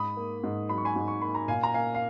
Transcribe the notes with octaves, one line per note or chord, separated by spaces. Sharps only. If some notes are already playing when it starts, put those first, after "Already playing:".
Already playing: G#2 B5 D#6
A#3
G#2
F#3 B5
C#6
G#5 B5
G#2
C#6
A#3 B5
A#5
A#2 F5 G#5
A#5
A#3 F5 G#5
F5